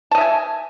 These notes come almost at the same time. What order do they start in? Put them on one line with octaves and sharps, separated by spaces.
A5 D#5 E5 G#5